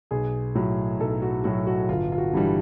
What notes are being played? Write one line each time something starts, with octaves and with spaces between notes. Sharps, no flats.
B1 G#4
A2 F#3
B1 A4
F#4
A2 F#3 F#4
F#4
G1 F4
F4
F#4
G2 E3 G3